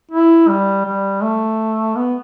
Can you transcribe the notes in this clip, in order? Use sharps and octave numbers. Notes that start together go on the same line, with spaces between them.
E4
G3
G3
A3
B3